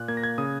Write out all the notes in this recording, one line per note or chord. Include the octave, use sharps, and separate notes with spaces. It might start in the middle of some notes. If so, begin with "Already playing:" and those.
Already playing: A#2 F#6
A#3 G#6
A#6
G#6
C#3 D#6